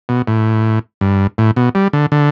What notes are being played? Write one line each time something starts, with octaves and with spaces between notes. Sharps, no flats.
B2
A2
G2
A2
B2
G3
D3
D3